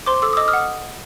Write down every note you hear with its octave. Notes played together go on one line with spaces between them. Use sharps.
C5 C6 D6
A4 D6 E6
D#6
D#5 D6 E6
D#6 F6
F#5